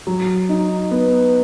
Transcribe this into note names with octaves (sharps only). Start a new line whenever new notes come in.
F#3
D#4
B3